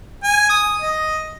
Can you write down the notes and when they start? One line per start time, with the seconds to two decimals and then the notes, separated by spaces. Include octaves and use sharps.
0.24 G#5
0.50 D#6
0.82 D#5